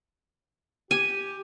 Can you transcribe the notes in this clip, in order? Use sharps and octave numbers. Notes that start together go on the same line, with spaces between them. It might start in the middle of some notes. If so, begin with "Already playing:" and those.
G4 G#5